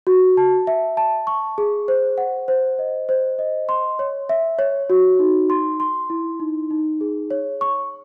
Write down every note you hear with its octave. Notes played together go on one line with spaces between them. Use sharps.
F#4
A5
E5
A5
C#6
G#4
C5
F#5
C5
D#5
C5
D#5
C6
C#5
E5
C#5
F#4
D#4
C6
C6
E4
D#4
D#4
G#4
C#5
C#6